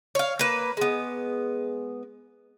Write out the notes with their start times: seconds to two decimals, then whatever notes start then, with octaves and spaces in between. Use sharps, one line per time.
0.15 C#5 F5
0.39 A#3 B4
0.77 G#3 B3